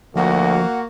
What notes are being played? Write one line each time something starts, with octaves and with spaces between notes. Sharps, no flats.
D2 F3 A#3 F#4 F#5